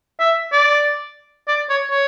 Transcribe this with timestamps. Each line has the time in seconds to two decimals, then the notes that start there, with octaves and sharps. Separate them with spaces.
0.20 E5
0.52 D5
1.48 D5
1.69 C#5
1.90 C#5